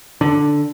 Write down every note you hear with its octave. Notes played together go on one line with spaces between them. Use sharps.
D3